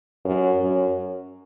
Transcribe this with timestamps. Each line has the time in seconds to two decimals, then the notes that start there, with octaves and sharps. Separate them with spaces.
0.25 F#2
0.60 F#2